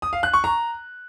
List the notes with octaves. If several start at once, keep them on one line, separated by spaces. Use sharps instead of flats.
D#6
F5
F#6
C#6
A#5